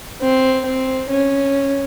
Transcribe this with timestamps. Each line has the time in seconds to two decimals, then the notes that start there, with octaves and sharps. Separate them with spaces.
0.21 C4
0.65 C4
1.09 C#4